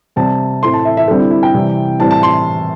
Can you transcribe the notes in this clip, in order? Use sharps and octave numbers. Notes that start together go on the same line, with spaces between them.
C3 G3 C4 A5
A2 A3 C4 C6
A5
E5
E5
D3 G3 C4 A4
E4
E4
G5
C3 E3 G3 C4
A2 E3 G3 C4 A5
A5
C6